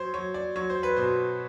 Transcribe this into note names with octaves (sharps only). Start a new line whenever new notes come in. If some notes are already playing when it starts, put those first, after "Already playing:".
Already playing: F#3 C5 C#5
F#3 C#5
D5
F#3 C#5
C5
B4
B2 C5